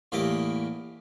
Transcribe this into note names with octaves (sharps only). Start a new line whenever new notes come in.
E2 A2 A#3 G4 D#5 D#6